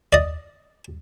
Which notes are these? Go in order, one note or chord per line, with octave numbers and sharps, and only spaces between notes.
D5 D#5